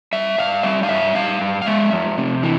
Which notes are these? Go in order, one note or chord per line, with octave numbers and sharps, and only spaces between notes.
G3 E5
G2 F5
G3 E5
F5
G2 E5
G3 F5
G2
F5
G#3 E5
F2
C3
E3